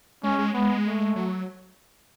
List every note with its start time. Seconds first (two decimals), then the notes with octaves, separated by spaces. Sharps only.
0.23 G#3 C#4
0.39 G#3
0.54 G#3 B3
0.86 A3
1.16 F#3